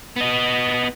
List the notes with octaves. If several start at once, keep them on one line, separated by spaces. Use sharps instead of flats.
B3 D#5